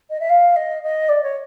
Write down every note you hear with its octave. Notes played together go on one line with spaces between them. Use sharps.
D#5
E5
F5
D#5
D#5
D5
C#5